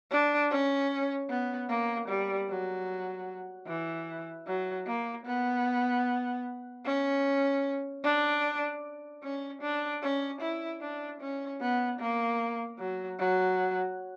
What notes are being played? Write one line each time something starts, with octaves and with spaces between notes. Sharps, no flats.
D4
C#4
B3
A#3
G3
F#3
E3
F#3
A#3
B3
C#4
D4
C#4
D4
C#4
E4
D4
C#4
B3
A#3
F#3
F#3